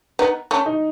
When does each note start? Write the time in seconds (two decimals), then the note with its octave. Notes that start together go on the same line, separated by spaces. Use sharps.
0.19 B3 D#4
0.51 A3 C#4
0.66 D#4